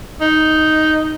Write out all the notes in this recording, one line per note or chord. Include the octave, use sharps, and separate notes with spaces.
D#4